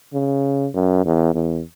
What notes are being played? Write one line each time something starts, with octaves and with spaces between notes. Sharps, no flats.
C#3
F#2
E2
E2